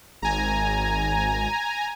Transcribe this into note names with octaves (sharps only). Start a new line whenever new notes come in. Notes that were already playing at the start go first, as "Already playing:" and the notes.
G#1 G#5 A#5